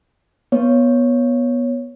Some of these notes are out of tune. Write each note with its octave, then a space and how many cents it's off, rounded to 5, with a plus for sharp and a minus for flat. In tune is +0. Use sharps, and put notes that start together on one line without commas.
B3 -15 C#5 +0